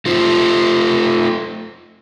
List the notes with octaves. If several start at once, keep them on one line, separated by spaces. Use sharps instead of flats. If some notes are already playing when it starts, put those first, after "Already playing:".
A3 F4 C5